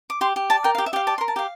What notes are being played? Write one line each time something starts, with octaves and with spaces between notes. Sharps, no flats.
D6
G4 C6
G4
D5 A5
A#4 G5
F5
G4
E5
G4 F5
D5 A5
C6
A#4
A5
G4 F5